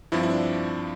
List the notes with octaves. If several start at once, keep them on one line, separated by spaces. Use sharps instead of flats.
G2 F3 C4 E4
E4
D4